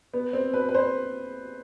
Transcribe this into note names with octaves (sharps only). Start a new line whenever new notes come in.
B3
C4
B4
B4
C5